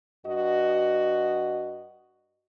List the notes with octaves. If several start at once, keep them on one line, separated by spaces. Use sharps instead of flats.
G2 F#4 D#5